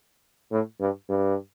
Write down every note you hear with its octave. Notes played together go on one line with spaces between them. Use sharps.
A2
G2
G2